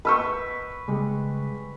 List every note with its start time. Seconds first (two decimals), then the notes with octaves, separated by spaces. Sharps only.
0.05 B4 D#5 C#6 E6 G6
0.88 C#3 G3 G#3